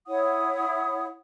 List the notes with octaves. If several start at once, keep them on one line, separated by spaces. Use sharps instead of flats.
E4 C#5 F#5 D#6